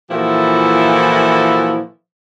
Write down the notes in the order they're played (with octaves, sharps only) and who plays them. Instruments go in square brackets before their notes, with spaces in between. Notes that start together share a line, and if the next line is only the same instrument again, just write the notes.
[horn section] A#2 E3 F3 E4 F#4 A4